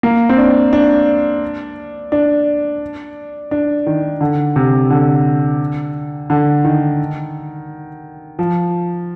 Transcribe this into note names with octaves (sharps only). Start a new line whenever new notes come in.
A#3
C4
D4
D4
D4
D4
D#3
D3
C3
D3
D3
D#3
F3